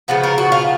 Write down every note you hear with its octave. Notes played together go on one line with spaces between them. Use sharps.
C#3 F3 B3 F#4
A#4
F#4
F4